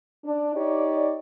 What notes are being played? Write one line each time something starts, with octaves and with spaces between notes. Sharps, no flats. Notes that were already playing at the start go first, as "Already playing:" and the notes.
D4
D#4 G4 C#5 D5